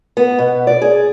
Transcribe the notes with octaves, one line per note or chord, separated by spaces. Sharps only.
B3
B2
D5
G#4